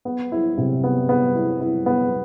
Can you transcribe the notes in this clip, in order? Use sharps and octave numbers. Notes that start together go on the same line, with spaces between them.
B3
E4
C3
B3
B3
E4
E4
B3